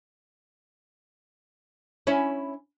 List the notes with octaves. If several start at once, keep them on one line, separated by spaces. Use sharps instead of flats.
C#4 E4